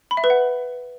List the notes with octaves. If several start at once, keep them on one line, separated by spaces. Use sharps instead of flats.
B5
E5
B4
F#5